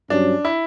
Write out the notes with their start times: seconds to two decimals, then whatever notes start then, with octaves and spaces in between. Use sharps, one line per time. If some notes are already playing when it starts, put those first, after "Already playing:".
0.10 G2 F#3 C#4 D4
0.45 E4